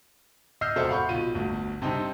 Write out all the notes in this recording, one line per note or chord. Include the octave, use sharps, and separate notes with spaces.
D#5 E6 F6 G6 C7
E1 C3 A4 C5 D5 E5
F5 F#5 B5 C#6 G6
B1 F4 D#7
G1 D2
G2 C3 C4 D#4